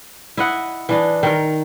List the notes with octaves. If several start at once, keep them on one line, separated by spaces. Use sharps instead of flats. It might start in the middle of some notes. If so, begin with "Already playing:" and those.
E4 D#5 F#5
E3 D4 D#5
D#3 A#4